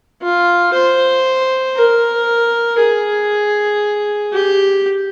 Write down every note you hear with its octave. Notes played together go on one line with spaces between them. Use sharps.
F4
C5
A#4
G#4
G4